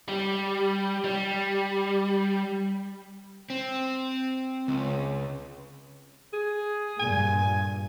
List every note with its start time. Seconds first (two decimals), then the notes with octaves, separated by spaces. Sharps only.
0.09 G3
1.05 G3
3.50 C4
4.68 C#2
6.33 G#4
7.00 G2 A#2 G#5